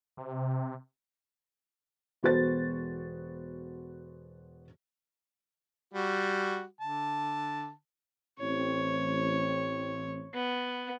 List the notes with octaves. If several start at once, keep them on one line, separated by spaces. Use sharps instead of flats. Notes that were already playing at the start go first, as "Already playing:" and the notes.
C3
E1 B3 F#4 A4 C5 A6
G3 F#4
D3 A5
A1 C4 C#5
B3